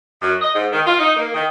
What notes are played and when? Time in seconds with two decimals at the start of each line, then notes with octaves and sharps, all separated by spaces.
0.21 F#2
0.41 D#5
0.54 G#2
0.72 D#3
0.87 F4
0.99 D#4
1.16 A#3
1.34 D#3